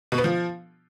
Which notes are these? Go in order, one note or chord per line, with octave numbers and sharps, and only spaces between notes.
B2
B3
F3